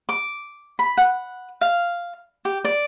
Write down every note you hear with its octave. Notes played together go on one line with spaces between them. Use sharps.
D6
B5
F#5
F5
G4
D5